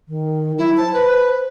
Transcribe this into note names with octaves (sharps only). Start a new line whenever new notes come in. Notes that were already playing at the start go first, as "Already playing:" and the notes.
D#3
F#3 E4
C5 A5
B4